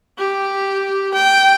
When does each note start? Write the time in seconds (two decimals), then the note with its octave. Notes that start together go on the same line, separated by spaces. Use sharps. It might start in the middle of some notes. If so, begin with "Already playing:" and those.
0.18 G4
1.14 G5